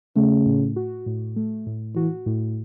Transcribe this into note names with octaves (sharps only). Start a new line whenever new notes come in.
C#3 A3
A2
F#4
A2
A3
A2
E3 F#4
A2